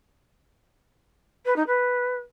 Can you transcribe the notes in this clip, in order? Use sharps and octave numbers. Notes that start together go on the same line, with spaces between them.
B4
D#4
B4